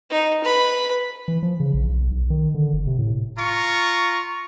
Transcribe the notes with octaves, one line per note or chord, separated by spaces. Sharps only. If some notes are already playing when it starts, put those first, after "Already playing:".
D#4
B4 B5
E3
F3
C#3
A#1
B1
B1
D#3
D3
F#1
C3
A2
F4 A#5 C#6